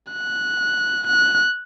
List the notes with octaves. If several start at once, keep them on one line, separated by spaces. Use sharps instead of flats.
F#6
F#6